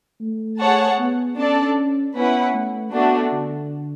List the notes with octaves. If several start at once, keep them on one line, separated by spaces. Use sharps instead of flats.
A3
G#4 C#5 F#5 A5
B3
C#4 D4 A4 D5 A5
B3 C#4 E4 B4 F#5
A3
A3 B3 D4 F#4
D3